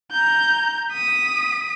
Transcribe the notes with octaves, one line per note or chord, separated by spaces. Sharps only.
A#5 G6
D#6 B6